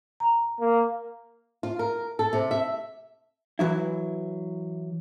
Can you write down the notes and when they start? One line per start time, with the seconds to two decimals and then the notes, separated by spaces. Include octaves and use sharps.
0.20 A#5
0.60 A#3
1.63 F4
1.79 A#4
2.19 A4
2.33 C3
2.51 E5
3.59 E3 F#3 E4